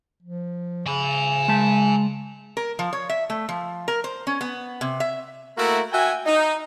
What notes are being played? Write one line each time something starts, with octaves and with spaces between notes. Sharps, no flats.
F3
C#3 G#5 B5
G#3 A5
A#4
F3
C#5
E5
A3
F3
A#4
C5
C#4
B3
C3
E5
A3 A#3 E4 F#4 A#4
F#4 E5 G5 G#5
D#4